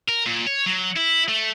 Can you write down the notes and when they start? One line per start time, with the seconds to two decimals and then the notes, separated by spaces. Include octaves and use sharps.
0.09 A#4
0.26 A#2
0.47 C#5
0.66 F#3
0.96 E4
1.29 A3